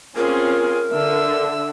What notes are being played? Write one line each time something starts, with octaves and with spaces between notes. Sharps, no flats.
C4 C#4 F4 G#4 A#4
D3 E5 E6